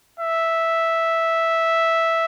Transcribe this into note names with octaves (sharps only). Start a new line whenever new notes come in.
E5